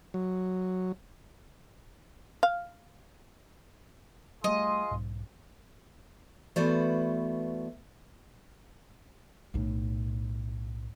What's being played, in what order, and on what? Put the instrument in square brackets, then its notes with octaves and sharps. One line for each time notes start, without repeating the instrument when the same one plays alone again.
[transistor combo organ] F#3
[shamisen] F5
[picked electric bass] G3 A3 [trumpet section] F4 G#4 C6 [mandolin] D#5
[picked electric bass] B1 G#2
[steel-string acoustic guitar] E3 A3 B3 F#4 C5 D5
[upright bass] B1 A2